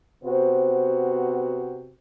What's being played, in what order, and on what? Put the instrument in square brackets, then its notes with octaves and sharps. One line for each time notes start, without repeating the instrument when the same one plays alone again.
[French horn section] C3 B3 F#4 C5